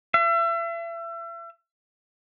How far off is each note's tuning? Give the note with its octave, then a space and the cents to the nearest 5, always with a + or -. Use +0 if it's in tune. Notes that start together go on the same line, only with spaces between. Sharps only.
E5 +35